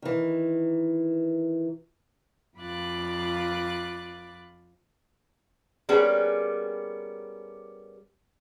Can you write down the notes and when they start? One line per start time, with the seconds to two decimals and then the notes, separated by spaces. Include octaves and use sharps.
0.02 D#3 E3
2.58 F2 F4 B5 D6 F#6 A6
5.89 G3 A#3 B3 C#4 G4 G#4